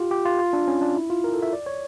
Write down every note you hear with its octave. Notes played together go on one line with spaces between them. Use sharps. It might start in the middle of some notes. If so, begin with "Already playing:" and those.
Already playing: F4 G4
G4
F4
F4
D4
C#4
D4
E4
F4
A#4
A4
E5
D5
C#5